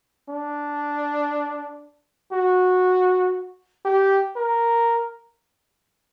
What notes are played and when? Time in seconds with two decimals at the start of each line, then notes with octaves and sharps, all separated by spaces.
0.29 D4
2.32 F#4
3.85 G4
4.36 A#4